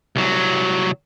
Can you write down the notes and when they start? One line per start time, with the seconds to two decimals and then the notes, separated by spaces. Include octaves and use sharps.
0.16 C2 F#3